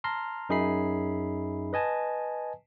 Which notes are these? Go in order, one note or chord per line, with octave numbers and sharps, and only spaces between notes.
A5 A#5 C6 F6
F#2 D#4 G#4 E5 B5 C7
B4 D#5 G#5 A5